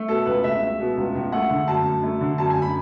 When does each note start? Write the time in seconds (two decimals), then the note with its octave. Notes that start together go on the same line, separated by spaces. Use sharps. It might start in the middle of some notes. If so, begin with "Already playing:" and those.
Already playing: A3
0.08 B2 A4
0.26 C#2 B4
0.44 C#2 E5
0.62 A3
0.79 B2
0.97 C#2
1.15 C#2
1.32 A3 F#5
1.50 D3
1.67 F#2 A5
1.85 F#2
2.03 A3
2.21 D3
2.38 F#2 A5
2.50 G#5
2.56 F#2
2.62 B5